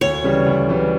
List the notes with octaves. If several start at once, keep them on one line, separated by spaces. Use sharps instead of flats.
D2 C#5
C#3 E3 G3
D2
C#3 E3 G3